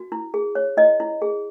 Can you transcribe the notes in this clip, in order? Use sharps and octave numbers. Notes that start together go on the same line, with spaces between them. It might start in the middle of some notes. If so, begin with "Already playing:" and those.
Already playing: F#4
E4
G#4
C#5
E4 D#5
E4
G#4